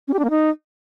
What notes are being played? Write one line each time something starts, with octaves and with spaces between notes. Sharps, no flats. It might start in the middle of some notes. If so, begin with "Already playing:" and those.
C#4
G4
D4
A#3
D#4